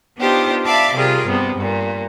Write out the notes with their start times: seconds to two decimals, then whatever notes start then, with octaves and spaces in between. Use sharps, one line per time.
0.19 B3 D4 D#4 F4 G4 C5
0.66 D5 E5 F5 A5 B5 D6
0.95 C3 G3 F4 G#4 A#4
1.26 G2 C3 B3
1.57 G2 A#2